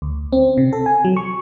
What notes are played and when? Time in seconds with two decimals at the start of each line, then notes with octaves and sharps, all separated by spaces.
0.02 D2
0.33 C4
0.58 C3
0.73 A4
0.86 G#5
1.05 F#3
1.17 C#6